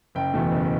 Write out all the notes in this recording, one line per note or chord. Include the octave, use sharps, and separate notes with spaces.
F#1 G5
E2 B2 A3
F#1